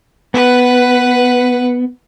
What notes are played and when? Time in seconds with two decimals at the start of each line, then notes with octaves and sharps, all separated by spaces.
0.34 B3 B4 F#5